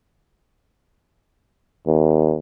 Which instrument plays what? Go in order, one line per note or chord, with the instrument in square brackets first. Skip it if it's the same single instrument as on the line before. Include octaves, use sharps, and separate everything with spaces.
[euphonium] D#2